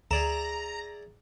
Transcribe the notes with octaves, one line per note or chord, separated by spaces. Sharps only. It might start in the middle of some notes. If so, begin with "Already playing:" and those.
D2 G#4 D5 E5 A#5 E7